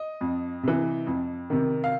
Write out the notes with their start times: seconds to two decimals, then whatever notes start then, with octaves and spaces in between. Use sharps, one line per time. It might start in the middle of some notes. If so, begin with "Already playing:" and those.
Already playing: D#5
0.21 F2
0.63 C3 E3
1.07 F2
1.50 C3 D#3
1.84 F5